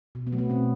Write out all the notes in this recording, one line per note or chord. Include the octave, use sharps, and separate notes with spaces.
B2
B3
F#3 A3
B3
B2 C4